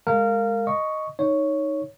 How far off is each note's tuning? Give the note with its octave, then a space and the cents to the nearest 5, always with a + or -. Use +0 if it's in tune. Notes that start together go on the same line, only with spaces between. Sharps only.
G#3 -5 A#4 -25 F5 +0
D#5 +0 C#6 +0
D#4 +0 C#5 +0